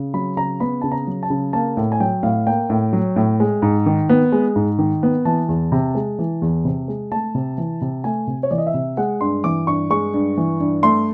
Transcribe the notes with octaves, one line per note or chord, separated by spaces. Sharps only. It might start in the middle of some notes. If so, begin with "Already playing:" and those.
Already playing: C#3
F#3 B5
C#3 A#5
B3 B5
C#3 A5
A#5
F#3
A5
C#3
A#3 A5
A2
G#5
F#3 G5
A2 F5
A#3 G5
A2
F#3
A2
G#3
G#2
D#3
B3
G#3
G#2
D#3
B3
E3 A5
E2
C3
G#3
E3
E2
C3
G#3
A3 A5
C3
E3
C3
A3 G#5
C3
C#5
E3 D5
D#5
E5
C3
G#3 F#5
G2 C6
E3 D6
G2 C#6
G#3 C#6
G2
E3
G2
A3 C6